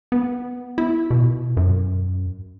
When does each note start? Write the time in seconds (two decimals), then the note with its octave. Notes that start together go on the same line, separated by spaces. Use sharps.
0.12 B3
0.78 E4
1.11 B2
1.57 F#2